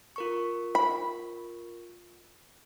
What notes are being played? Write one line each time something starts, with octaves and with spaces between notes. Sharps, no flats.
F4 A#4 C#6
B5